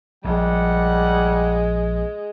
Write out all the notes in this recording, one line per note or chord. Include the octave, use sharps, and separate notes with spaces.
A#1 G3 G#3 F#5